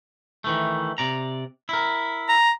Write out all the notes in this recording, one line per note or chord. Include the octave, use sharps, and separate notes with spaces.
D#3 E3 A3
C3 D5 A#5
E4 A#4
A#5